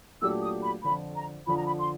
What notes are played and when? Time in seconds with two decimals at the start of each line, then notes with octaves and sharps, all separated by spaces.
0.22 A#2 F#3 A3 D4 G4 E6
0.42 D#6
0.63 B5
0.84 F2 D3 F3 B5
1.15 A#5
1.47 F2 D3 F3 B5
1.57 A#5
1.66 B5
1.79 C6